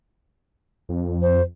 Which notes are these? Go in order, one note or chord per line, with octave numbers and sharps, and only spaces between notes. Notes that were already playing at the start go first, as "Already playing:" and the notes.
F2
C5